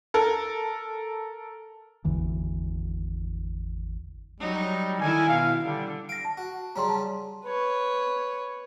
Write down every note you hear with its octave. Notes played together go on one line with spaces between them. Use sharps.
A4 A#4
G#1 E2 D3 E3
F#3 G3 D#4
D3 D#3 E4 G#5
B2 F5
D3 G3
F5 A#6 D7
A5
F#4
C#3 G3 C#4 A#5 C6
A5
B4 C#5